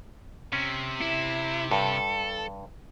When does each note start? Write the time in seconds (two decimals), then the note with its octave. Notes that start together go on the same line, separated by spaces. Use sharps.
0.53 C3 C#4
1.01 E4
1.71 G2 A4